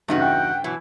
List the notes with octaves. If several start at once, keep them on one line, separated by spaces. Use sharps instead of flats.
E2 G2 C#3 D#4 F#4
F#5 G5
B2 E3 F#3 E4